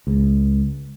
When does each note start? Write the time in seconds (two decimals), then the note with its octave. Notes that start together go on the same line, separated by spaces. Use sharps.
0.07 C#2